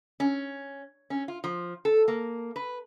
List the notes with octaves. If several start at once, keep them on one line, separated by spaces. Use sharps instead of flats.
C#4
C#4
F4
F3
A4
A#3
B4